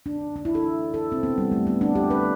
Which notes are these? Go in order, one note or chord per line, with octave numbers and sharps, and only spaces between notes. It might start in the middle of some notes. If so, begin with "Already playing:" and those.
D4
D4
E4
A4
A4
C4
B3
G3
A3
B3
D4
G4
B4